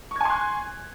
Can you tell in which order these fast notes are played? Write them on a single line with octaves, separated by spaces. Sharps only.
C#6 G#6 G#5 C6 F#6